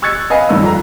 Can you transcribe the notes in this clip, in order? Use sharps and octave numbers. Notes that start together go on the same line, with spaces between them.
C#6 E6 F#6 G#6 A6 C#7
B4 D#5 F5 G#5 B5
F#1 G2 D#3 E6
F2 A#5